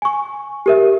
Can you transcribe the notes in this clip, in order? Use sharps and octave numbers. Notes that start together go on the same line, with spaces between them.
G#5 C#6
G4 A#4 E5